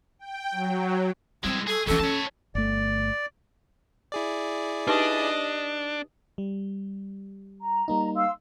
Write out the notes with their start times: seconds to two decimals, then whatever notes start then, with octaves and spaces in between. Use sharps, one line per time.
0.19 G5
0.51 F#3
1.44 G3 G#3 C4 E4
1.67 G#4 A4 G#5
1.87 F2 E3 C#4 A4
1.99 C#4 C#5 A5
2.55 G1 A3 D5
4.12 E4 G#4 D5
4.87 D4 D#4 G4 B4 D#5
6.38 G3
7.60 A#5
7.88 G3 A#3 D#4
8.15 F5 C6 E6